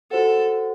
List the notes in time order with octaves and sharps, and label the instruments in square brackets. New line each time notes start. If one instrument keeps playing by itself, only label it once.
[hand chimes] F#4 C5 F#5 [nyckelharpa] A4